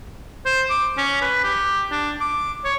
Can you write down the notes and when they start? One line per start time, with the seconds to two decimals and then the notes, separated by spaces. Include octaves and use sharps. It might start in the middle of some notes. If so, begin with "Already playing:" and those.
0.46 C5
0.70 D6
0.97 C#4
1.22 B4
1.44 G4
1.91 D4
2.21 D6
2.65 C#5